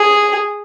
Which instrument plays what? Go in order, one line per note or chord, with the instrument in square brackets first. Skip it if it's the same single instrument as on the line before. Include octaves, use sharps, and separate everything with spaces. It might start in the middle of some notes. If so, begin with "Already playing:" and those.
Already playing: [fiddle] G#4